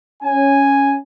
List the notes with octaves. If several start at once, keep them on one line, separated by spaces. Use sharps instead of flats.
C#4 G#5